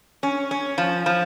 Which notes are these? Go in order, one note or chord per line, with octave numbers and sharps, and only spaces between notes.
C#4
C#4
F3
F3